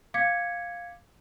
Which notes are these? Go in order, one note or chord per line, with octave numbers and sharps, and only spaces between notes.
F5 D6 G#6 B6 C#7